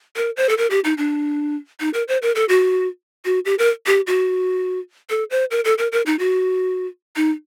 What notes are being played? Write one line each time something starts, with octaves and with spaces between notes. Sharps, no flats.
A#4
C5
A4
A#4
G4
D#4
D4
D#4
A#4
C5
A#4
A4
F#4
F#4
G4
A#4
G4
F#4
A4
C5
A#4
A4
A#4
A#4
D#4
F#4
D#4